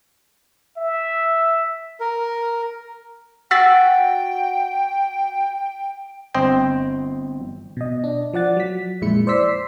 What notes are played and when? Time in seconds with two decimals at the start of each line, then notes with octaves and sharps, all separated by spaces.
0.77 E5
2.00 A#4
3.51 F#4 G5 E6 A6 B6
6.35 G1 C4 C5 D#5 G5
7.77 B2 D#5
8.04 D4
8.34 F3 D5 F#5 A6
8.57 F#3 B6
9.01 F2 A#2 G#3 E4 C#7
9.27 C5 D5 C6 E6 B6 C7